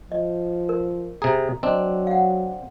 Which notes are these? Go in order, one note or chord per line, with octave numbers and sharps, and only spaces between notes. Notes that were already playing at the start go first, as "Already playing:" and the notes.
F3 D#5
A#4
C3 G#4 A#5
F#3 C4 D4 D#5
F5 F#5